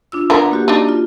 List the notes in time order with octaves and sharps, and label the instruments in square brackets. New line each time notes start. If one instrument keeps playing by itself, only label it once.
[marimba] D4 F4 E6
[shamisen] D3 B3 A#4
[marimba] A#3 F#4 G4
[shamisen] D4 D#4
[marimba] F4